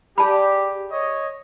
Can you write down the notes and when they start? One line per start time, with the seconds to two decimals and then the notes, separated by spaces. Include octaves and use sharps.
0.18 G4 G#4 D5 G#5 A5 B5
0.91 C#5 D#5